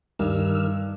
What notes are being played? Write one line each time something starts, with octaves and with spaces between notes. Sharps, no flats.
G2 D#3 E6 F6